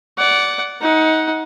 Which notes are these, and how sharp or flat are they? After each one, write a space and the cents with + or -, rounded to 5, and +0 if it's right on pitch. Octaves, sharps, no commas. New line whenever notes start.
D5 -15 F#5 +10
D#4 +25 F#5 +0